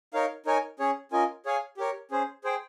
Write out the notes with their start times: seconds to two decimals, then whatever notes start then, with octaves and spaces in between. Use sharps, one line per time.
0.13 D#4 A#4 C#5 F5
0.46 D#4 A#4 C#5 G#5
0.79 C#4 G#4 C#5
1.12 C#4 F4 A#4 D#5 G#5
1.46 G#4 C#5 F5 G#5
1.77 G4 A#4 C#5
2.11 C#4 G#4 C5
2.44 G#4 C5 G5